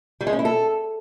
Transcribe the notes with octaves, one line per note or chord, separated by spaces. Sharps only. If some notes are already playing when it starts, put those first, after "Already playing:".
G3
G#3
C#4
E4
A4